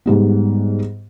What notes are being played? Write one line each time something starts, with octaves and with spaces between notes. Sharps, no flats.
G#2 G3 B3